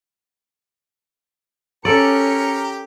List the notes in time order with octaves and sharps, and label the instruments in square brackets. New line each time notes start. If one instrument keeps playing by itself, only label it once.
[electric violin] C#4 C#7 [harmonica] G4 A#4 A#5 [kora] A4 D5